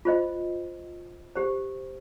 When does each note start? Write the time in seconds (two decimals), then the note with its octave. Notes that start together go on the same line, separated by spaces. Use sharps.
0.05 F4 C5 D#5
1.36 G4 C5